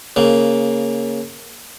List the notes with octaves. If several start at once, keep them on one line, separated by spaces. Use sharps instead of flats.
C#3 A#3